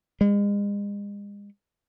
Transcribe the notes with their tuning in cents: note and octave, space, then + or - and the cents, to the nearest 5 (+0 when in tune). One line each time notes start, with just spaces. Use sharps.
G#3 -40